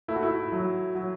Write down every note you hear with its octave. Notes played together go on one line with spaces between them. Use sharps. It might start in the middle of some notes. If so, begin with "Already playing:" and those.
A3 E4
F#4
E4
F#3
F#3